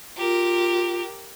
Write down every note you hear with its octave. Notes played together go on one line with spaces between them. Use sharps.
F4 G4 A#4